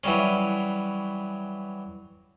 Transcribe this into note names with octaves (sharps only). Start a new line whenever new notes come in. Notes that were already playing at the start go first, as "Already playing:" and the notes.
E3 F#3 G3 C#4